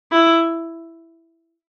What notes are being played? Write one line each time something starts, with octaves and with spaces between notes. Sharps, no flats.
E4